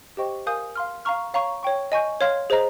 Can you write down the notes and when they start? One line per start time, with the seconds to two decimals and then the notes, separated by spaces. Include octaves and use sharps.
0.17 G4 C5 D#5 G5 C#6
0.46 A#4 F5 G#5 D#6 G6
0.76 F5 C6 F6
1.05 F5 A#5 C#6 F6
1.34 C#5 F5 A#5 C#6
1.63 C#5 G5 C#6
1.92 D#5 G#5 C#6 G6
2.21 C#5 F5 C6 F6
2.50 G#4 C5 D#5 A#5